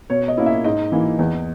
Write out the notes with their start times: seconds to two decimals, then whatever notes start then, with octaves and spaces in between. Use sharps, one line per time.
0.10 B2 C#5
0.28 D#5
0.37 A#3 C#4 E4
0.46 E5
0.64 G#2 D#5
0.92 E3 A#3 E4
1.19 E2